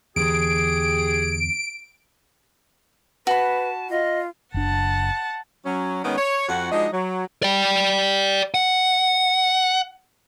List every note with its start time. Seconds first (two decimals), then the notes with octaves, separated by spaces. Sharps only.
0.16 E2 D3 G4 G#4 D7
3.27 F#4 B4 A5 B5
3.90 F4 D#5
4.54 F#1 D4 F#5 A5
5.65 F#3 C#4
6.04 D#3 G#3 B3 C#4
6.18 C#5
6.49 F2 F#4 F#5
6.72 F3 G#3 D4 D#4 F#4 D#5
6.93 F#3
7.43 D5 G5
8.54 F#5